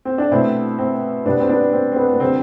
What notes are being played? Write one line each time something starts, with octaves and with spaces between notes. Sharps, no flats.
C4
D4
B2 A3 C4 E4
C4
B2 G3 B3 D4
C4
B3 D4
C4
C4
B3
B3
D3 G3 C4